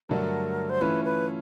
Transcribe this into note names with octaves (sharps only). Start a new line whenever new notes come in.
G2 D3 F#3 A3 D4 A#4
C5
E3 A3 C#4 F4 B4
B4